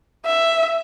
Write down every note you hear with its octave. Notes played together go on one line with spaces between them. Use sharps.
E5